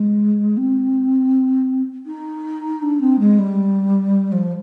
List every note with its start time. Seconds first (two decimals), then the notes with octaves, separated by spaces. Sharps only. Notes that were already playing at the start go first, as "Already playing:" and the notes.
Already playing: G#3
0.57 C4
2.06 D#4
2.82 D4
3.01 C4
3.19 G#3
3.38 G3
4.32 F3